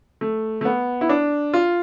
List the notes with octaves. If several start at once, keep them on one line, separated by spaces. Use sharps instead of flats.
A3
A3
B3
E4
D4
F4